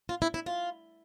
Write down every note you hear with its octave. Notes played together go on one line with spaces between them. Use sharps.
F4
E4
E4
F4